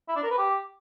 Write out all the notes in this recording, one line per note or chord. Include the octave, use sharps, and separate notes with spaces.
E4
D4
A#4
B4
G4